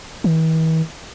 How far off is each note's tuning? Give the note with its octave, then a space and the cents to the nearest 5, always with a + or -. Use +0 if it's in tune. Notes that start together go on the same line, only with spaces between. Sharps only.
E3 -45